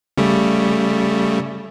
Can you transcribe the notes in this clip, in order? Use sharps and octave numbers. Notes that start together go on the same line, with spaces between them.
C#3 G3 A3